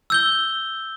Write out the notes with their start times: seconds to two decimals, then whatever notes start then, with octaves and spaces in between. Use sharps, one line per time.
0.10 E6 G6 G7